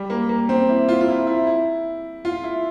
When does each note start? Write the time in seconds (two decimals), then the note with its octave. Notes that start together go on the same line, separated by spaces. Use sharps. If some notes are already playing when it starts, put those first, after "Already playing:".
Already playing: G3
0.10 A#3
0.29 A#3
0.49 C4
0.69 E4
0.89 F4
1.01 F4
1.08 E4
1.27 E4
1.47 E4
2.25 F4
2.44 E4